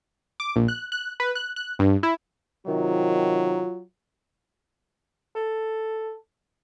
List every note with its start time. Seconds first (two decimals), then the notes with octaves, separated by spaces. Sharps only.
0.40 D6
0.56 A#1
0.68 F#6
0.92 F#6
1.20 B4
1.35 F#6
1.56 F#6
1.79 G2
2.03 E4
2.67 C3 D#3 F#3 F4
5.35 A4